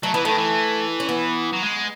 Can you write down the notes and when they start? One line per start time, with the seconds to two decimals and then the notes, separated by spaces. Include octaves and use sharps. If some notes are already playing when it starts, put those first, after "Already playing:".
0.03 F#3 A3
0.14 E3 B3
0.25 D#3 A3
0.38 E3
1.00 C#4
1.09 B3
1.53 F#3
1.62 G#3